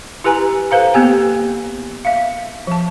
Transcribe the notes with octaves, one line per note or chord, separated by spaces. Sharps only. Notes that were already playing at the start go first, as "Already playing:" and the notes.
E4 G4 B4 G#5 A#5
A4 B4 C5 F5 A#5
A#3 B3 G4 G5 G#5
E5 F5
F3 A5